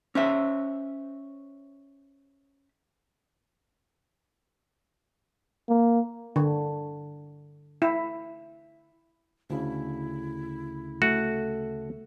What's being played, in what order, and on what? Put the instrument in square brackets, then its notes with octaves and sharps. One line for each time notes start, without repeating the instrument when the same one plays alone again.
[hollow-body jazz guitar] C#4 C5 E5
[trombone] A#3
[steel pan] D3
E4
[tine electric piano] D2 C#3 [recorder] E4
[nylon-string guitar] A3 [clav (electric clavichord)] F#4